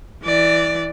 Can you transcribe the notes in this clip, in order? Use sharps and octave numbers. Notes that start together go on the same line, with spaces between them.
E3 D5